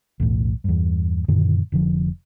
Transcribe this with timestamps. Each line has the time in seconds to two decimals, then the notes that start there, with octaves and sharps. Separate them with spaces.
0.20 B1 E2 A2
0.64 E2 G2
1.28 F#2 A#2 D3 D#3
1.72 F1 D3 F3